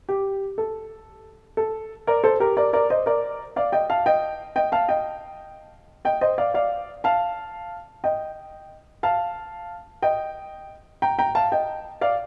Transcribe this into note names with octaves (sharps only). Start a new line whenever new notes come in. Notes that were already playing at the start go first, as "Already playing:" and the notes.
G4
A4
A4
A#4 D5
A4 C5
G4 A#4
A#4 D5
A#4 D5
C5 D#5
A#4 D5
D5 F5
D#5 G5
F5 A5
D#5 G5
D#5 G5
F5 A5
D#5 G5
D#5 G5
C5 D#5
D5 F5
D5 F5
F5 A5
D#5 G5
F5 A5
D#5 G5
G5 A#5
G5 A#5
F5 A5
D#5 G5
D5 F5